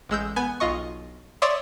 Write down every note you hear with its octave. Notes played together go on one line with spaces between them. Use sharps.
A1 G#3 E6 G6
B3 G#5
B1 F4 D#5 C#6
C#5 D5 E5 C6 D#6